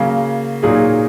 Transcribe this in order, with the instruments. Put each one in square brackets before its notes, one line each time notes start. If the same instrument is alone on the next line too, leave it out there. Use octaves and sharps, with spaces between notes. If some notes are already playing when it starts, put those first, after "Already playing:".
Already playing: [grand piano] C#3 F#3 A#3
A#2 F#3 A#3 D#4 G#4